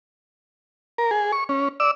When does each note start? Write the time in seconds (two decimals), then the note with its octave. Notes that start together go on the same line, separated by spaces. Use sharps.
0.98 A#4
1.11 G#4
1.32 C#6
1.49 C#4
1.80 D5 E6